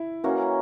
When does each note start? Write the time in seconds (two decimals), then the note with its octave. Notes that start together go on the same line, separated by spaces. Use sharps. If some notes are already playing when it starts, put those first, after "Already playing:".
Already playing: E4
0.24 E3 A#3 C#4 F#4